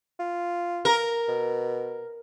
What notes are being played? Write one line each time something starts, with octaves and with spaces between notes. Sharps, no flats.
F4
A#4
B2